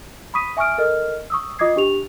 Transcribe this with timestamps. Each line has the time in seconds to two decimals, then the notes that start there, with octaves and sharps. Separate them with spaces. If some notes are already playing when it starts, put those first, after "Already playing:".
0.34 B5 C#6 D#6 B6 D#7
0.57 E5 G#5 C#6 D#6 F6 D7
0.78 A4 A#4 D#5 F6
1.30 C#6 D#6 E6
1.59 F4 D#5 D6 D#6 G#6 C7
1.76 D4 G4 F7